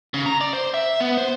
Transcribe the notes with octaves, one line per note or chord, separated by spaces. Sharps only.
C#3
A#5
D5
C5
E5
B3
C5